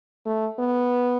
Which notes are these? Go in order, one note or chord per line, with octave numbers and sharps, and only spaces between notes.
A3
B3